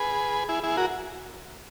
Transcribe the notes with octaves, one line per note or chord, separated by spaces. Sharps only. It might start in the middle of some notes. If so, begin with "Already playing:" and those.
Already playing: G#4 B4
E4 G#4
E4 G#4
F#4 A#4